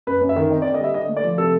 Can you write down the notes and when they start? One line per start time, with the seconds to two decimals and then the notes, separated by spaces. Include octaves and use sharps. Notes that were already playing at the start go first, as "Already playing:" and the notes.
0.07 F#2 B4
0.21 F#2
0.29 E5
0.36 D#3
0.51 C4 D#5
0.62 D5
0.65 D3
0.74 D#5
0.80 G3 E5
0.94 D3 D#5
1.09 A3
1.17 D5
1.23 F3
1.38 C3 A4